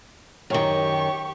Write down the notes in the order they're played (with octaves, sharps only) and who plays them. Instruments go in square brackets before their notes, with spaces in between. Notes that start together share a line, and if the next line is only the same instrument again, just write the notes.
[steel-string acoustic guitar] F#2 D#3 [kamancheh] G4 C#6